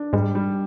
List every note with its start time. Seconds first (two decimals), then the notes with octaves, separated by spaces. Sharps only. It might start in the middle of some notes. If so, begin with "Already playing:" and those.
Already playing: D4
0.13 G#2 G3 G#3
0.35 G3